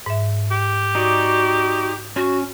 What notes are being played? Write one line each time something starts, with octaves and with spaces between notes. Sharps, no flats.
G#2 E5
G4
D#4 F#4 D5
C#4 F#4